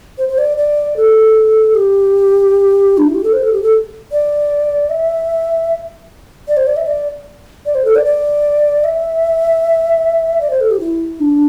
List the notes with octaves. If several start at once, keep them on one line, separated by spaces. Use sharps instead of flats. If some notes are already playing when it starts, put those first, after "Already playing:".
C5
C5
D5
D5
A4
G4
D4
E4
G4
A4
C5
A4
G4
A4
D5
E5
D5
C5
D5
E5
D5
D5
C5
A4
D5
D5
E5
D5
C5
A4
G4
E4
D4